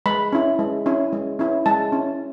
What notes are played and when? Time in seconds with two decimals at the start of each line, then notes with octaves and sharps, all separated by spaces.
0.06 G#3 B5
0.33 C#4 E4
0.59 G#3
0.86 C#4 E4
1.13 G#3
1.39 C#4 E4
1.66 G#3 A5
1.92 C#4 E4